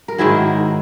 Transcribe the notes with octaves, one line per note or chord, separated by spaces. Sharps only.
A#4
G#2 D#3 F#3 E4 G#4